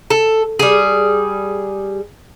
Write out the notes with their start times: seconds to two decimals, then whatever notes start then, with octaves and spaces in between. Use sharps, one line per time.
0.10 A4
0.59 G3 G#4